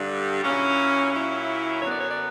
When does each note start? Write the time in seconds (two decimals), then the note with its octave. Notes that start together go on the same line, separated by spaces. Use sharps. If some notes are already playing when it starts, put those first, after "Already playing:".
Already playing: G2 D3 G3
0.42 A#2 F#3 C#4 E4
1.12 A#2 F#3 C#4 E4
1.81 F#2 D3 F#3 B3 C#5
1.91 D5
2.01 C#5
2.11 D5